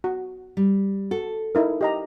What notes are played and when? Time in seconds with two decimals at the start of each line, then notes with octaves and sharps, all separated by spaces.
0.04 F#4
0.57 G3
1.11 F#4 A4
1.55 D#4 E4 A#4
1.81 G4 D#5 A#5